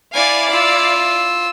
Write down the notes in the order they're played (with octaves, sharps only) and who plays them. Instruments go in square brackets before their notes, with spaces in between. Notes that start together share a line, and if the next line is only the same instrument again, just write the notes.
[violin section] E4 D5 F5 [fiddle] G#5
[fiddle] F4 E6